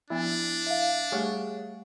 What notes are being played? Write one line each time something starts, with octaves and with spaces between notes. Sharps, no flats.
F3 B3 D4 E4 G#5
E5 F5
G3 A3 G4 G#4 C#5 F#5